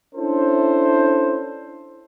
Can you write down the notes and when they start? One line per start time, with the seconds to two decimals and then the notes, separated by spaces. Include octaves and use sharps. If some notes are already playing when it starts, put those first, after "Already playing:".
0.15 C#4 D4 E4 A4 C5